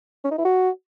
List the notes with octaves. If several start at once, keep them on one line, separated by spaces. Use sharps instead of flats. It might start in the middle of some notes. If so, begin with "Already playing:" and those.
C#4
D#4
E4
F#4